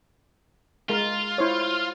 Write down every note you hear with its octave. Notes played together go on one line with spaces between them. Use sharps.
G#3 F4 A#4
E4 C5 C#5